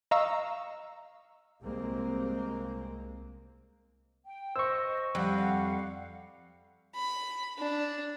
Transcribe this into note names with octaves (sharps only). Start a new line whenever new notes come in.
D#5 F5 A#5 C#6 E6
C2 G#3 A#3 C4
G5
C5 D#5 C#6 E6
F2 G3 F5 F#5
B5
D4